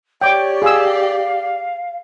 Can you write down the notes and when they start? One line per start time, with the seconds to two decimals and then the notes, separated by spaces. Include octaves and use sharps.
0.21 G4 C#5 D5 G5 D6
0.62 G#4 F5 E6